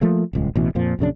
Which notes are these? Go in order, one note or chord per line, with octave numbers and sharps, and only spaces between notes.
F3 A3 A#3
D#1 C#2 G#3
A1 B2 E3
F2 A#2 F3
A#1 F#2 C#3 D4